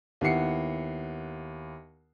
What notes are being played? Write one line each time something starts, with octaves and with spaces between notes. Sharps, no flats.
D#2 B3 E4 F#5 C7 C#7